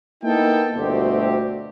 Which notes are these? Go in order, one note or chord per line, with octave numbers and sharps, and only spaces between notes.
A#3 B3 D#4 E4 A4 G5
G1 D2 B2 A3 C4 G4